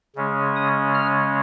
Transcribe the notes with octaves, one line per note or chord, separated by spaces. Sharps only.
C#3 G#3 C#4
D#6
F6